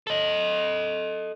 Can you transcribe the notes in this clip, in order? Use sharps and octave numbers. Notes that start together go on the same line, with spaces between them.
A4 D#5